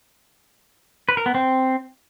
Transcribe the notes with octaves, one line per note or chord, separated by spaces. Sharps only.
B4
A#4
B3
C4